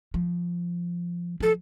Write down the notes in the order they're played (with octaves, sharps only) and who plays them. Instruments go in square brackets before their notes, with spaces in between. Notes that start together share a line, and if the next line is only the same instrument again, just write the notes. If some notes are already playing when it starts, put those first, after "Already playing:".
[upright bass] F3
[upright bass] F3 [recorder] A4